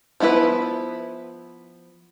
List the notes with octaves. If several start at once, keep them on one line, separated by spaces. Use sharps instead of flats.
F3 B3 E4 F4 B4